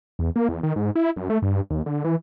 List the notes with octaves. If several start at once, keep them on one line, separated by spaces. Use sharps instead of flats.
E2
A#3
E2
D#3
G#2
E4
F#2
A3
G2
D#2
D3
E3